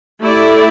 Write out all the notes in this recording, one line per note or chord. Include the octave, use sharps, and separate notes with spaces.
A3 E4 G4 D5